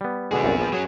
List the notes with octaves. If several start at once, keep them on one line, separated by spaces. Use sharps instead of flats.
G3 B3
B2 D3 G#3 B3 G#4
C2 F#2 A#2
A#1 F3
F#3 C#4 F#4 G#4 C#5